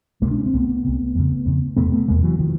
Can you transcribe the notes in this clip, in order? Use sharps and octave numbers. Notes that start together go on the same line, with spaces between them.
D2 C3 G#3 A#3
D4
C#4
C4
C2 C3 A3 B3
C2 C3
F2 C#3
F2 C#3
E2 C3 A3 B3
A3 B3
E2 C3 G#3 A#3
E3 F#3
C3 D#3 F3